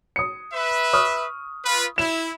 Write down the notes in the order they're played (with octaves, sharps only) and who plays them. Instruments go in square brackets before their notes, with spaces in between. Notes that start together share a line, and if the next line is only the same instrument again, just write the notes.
[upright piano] D#6 C#7
[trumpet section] B4 E5
[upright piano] C#6 D#6 F6
[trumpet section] F4 B4
[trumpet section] E4 [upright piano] E7